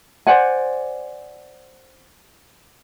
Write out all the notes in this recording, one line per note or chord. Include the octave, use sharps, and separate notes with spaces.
C5 D5 F#5 G#5